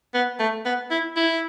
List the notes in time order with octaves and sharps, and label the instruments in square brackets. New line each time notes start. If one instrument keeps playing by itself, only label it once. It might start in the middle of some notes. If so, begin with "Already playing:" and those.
[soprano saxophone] B3
A3
B3
E4
E4